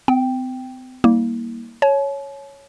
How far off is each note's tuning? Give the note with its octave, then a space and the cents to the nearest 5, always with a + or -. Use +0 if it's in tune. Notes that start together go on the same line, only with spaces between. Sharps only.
C4 -45 G5 +0
G3 +0 A#3 +0 E4 -40
C#5 +0 A5 -45